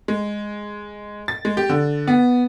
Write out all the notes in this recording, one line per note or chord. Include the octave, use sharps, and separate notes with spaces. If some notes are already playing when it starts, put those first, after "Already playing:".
G#3
A6
G#3
G4
D3
B3